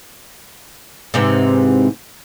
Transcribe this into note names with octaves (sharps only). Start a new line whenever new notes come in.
G#2 C3 E3